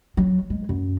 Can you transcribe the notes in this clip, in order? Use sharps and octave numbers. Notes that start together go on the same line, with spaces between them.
F#3
G#3
F#2